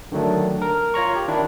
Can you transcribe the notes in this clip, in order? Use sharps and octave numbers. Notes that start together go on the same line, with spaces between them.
D3 D#3 F#3 A3 D4
A#4
F4 C#5 A#5 C#6
G4
D#3 D4 E4